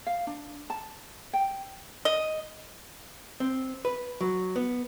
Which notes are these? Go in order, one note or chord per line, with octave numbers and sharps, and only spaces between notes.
F5
D4
A5
G5
D#5
C4
B4
F#3
B3